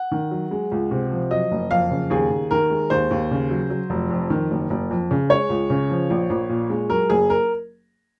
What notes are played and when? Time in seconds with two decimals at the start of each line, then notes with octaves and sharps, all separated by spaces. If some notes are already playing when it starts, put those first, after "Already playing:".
Already playing: F#5
0.11 D#3
0.31 F#3
0.51 G#3
0.71 C#2
0.91 C3
1.11 F3
1.31 F#3 D#5
1.52 F#1
1.71 F2 F5
1.91 C#3
2.10 D#2 G#4
2.30 D#2
2.51 D#3 A#4
2.70 G#3
2.90 D#2 C5
3.11 D#2
3.31 C#3
3.51 F#3
3.70 F#3
3.90 F1
4.11 F2
4.30 D#3
4.51 F#1
4.70 F#1
4.91 F2
5.11 C#3
5.29 G#3 C#5
5.49 C#2
5.70 C#3
5.90 F3
6.10 A#1
6.30 A#1
6.49 A#2
6.70 G#3
6.89 F#3 A#4
7.10 F#1 G#4
7.30 A#4